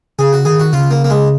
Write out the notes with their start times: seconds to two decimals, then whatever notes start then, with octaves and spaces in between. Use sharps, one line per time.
0.19 C#3 G#4
0.33 F#4
0.45 D#3 G#4
0.60 F#4
0.73 C#3 F4
0.91 A#3
1.04 A#3
1.10 G#3